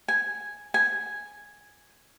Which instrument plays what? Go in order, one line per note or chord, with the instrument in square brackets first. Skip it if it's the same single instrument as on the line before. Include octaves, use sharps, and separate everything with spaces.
[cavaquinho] G#5
G#5